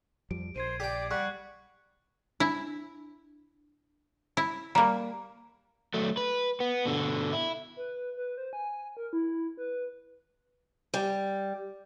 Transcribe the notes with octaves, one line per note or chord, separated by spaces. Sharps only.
F2 F3 G3 D7
A#1 C5 G#6 C7 D#7
G4 D5 G5 B6
G3 F#5 C#6 F#6
D4 E4
E4
G3 A#3 A#5
F#3 A3
B4
B3
B2 D3
E4
B4
B4
C5
G#5
A#4
E4
B4
G3